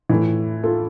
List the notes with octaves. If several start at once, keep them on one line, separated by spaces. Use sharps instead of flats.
A2 E3
F4 A4